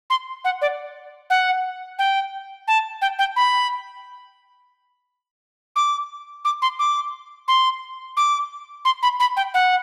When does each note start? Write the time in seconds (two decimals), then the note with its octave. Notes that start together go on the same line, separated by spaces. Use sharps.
0.10 C6
0.45 F#5
0.62 D5
1.30 F#5
1.99 G5
2.68 A5
3.02 G5
3.19 G5
3.36 B5
5.76 D6
6.45 D6
6.62 C6
6.79 D6
7.48 C6
8.17 D6
8.85 C6
9.03 B5
9.20 B5
9.37 G5
9.54 F#5